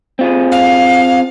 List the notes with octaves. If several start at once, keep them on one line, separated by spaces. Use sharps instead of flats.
C4 F4 G#4
F5